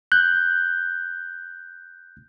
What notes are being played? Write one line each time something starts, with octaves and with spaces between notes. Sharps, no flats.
F#6 G6